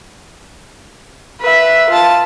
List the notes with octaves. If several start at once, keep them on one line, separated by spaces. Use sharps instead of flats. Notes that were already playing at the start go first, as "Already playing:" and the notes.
B4 E5
F4 A5